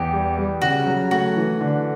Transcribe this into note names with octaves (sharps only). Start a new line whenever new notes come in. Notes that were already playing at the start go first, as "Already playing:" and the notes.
Already playing: E2 G4
G3
G3
C#3 F#4
F#3
A3 F#4
E3
D3